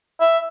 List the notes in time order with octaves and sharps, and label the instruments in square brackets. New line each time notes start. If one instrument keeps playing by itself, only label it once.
[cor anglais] E5